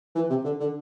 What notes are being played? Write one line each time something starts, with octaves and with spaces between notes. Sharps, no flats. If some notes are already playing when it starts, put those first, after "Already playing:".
E3
C3
D3
D3